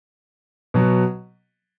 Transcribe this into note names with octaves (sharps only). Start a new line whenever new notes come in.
B2 F#3